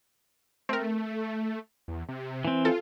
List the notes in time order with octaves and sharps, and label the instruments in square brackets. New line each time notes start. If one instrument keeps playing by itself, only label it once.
[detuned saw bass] A3 [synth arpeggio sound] C4 A#4
[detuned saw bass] E2
C3
[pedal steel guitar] E3 C4
[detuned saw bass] F4 [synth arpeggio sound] A4